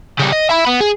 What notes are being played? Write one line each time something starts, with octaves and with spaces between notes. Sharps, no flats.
C#3 G3
D#5
E5 B5
B3
G#4